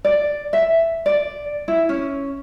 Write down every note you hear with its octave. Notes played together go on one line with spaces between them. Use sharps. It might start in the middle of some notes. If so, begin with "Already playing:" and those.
D5
E5
D5
E4
C#4